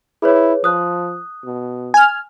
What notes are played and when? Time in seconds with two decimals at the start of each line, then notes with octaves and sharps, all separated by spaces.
0.22 E4 G#4 B4 C#5
0.64 F3 D#6 F#6
1.44 B2
1.94 G#5 F6